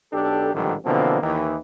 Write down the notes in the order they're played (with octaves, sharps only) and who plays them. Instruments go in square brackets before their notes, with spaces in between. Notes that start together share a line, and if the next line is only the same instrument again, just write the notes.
[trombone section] B1 D4 G4 A4
A1 G#2 D3 D#3 F3 G3
B2 D3 E3 F3 A#3 C4
D#2 D#3 E3